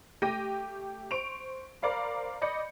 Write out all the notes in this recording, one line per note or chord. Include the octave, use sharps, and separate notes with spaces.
A3 G4 G5 A#6 D#7
C5 C#6 D7 F7
A#4 C5 D5 F5 B5
D5 D#5 B5 G6 C#7